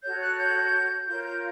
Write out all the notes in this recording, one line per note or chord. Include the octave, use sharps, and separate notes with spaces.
F#4 A4 C#5 G6
F#6
G6
F4 A#4 C#5 G6
G6